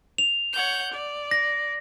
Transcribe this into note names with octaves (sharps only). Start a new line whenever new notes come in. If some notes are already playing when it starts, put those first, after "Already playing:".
F7
C#5 F#5 G6
D5
A#6